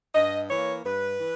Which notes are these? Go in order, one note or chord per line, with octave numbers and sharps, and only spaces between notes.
G2 D#5
E3 A#3 C#5
G2 B4
E3